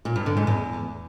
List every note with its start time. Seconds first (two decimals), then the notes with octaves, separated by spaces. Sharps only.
0.05 A#2
0.16 G2
0.26 D3
0.37 G#2
0.47 E2